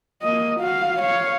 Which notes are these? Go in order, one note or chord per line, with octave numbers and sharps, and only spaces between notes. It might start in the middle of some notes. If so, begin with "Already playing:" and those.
A#3 D#5
F#4 F5
C#5 F5